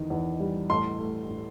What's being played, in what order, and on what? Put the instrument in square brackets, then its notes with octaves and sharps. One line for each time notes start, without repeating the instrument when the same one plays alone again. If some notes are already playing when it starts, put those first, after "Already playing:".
Already playing: [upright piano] E2 D#3
E2
G3
A2 C6
A3
A2